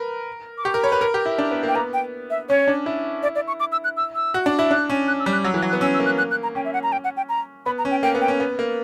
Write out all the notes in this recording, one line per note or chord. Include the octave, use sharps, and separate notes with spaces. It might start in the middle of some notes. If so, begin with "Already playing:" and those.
Already playing: A#4 B4
D6
G4 C#6
A#4
C#5 B5
B4
A#4
G4
E4
D4
B3
A#3
G5
B3 A#5
G5
E5
C#4 C#5
D4
E4
D5
D5
C#6
D6
E6
F#6
E6
E6
F#4
D4
E4
D4 F#6
C#4
F#6
E6
G3
F#6
F#3 E6
E3 F#6
F#3
F#6
B3
C#4 E6
E6
A#3
F#6
F#6
F#6
A#5
C#4 G5
E5
F#5
A#5
G5
F#5
G5
A#5
B3 B5
A#5
C#4
G5
A#3 G5
B3
G5
C#4
B3
A#3